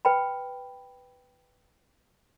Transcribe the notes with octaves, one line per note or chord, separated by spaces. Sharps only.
B4 G5 B5